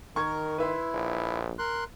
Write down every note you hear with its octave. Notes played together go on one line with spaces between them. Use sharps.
D#3 A#4 C#6 G#6
E4 B4 E5 C6
A#1
A#4 C6 F#6